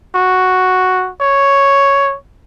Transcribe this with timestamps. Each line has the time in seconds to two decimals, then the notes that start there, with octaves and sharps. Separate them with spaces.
0.15 F#4
1.21 C#5